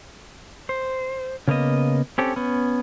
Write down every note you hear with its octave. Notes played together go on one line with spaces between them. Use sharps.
C5
C#3 A#3 B3 D#5
C4 C#4 G4 A4
B3 C#4